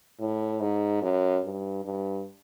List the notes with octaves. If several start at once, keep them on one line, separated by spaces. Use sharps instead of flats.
A2
G#2
F#2
G2
G2